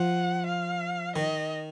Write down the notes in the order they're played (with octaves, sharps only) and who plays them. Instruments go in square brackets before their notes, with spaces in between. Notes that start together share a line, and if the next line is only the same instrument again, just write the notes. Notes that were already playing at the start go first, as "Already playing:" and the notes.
Already playing: [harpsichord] F3 [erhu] F#5
[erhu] F5
[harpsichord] D#3 [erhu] D#5